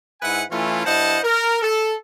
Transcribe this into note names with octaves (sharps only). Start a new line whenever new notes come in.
G#2 E4 B4 E5 F#5 G#5
E3 A3 C#4 E4 F4
G2 E4 C5 D#5 F#5 A5
A#4
A4